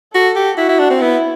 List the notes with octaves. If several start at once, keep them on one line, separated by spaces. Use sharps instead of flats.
F#4 A4
G4
E4 F#4
E4
D4
C4
B3 E4